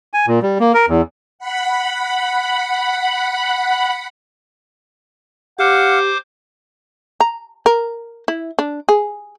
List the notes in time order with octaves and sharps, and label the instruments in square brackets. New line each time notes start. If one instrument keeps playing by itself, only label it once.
[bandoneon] G#5
A#2
G3
A#3
A#4
E2
[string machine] F#5 B5
[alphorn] G4 [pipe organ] C5 D6 [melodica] F5 [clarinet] F#5
[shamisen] A#5
A#4
E4
D4
G#4